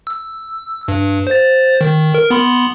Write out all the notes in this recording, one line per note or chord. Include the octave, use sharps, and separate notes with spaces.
E6
G2
C5 A6
D#3
A#4
B3 B5 C6